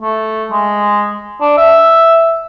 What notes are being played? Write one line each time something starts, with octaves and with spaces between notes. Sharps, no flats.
A3
G#3
D4
E5